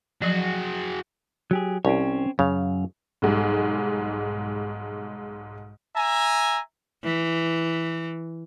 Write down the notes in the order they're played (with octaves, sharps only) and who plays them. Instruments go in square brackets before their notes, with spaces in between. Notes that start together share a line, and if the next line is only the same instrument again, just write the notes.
[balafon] F3 F#3 [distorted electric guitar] F#4 G#4
[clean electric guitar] F#3 G4 G#4
[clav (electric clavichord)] C2 [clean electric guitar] C4 C#4 C#5
[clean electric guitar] F#2 F5 [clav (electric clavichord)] C#3
[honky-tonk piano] B1 G#2 G3
[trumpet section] E5 G#5 A#5
[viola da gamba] E3